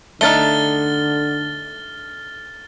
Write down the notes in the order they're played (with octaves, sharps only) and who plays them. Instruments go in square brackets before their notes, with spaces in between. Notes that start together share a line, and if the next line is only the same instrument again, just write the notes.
[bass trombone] D3 [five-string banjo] A3 D4 D#4 [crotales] F6 A6 G7